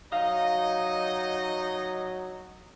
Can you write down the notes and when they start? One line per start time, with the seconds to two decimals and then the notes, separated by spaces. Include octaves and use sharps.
0.12 F#3 D#4 D#5 F5